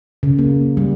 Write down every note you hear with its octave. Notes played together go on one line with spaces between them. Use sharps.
C#3
A#3
G3